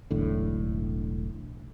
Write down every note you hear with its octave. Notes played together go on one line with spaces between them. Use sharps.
E1 B1 A2 D3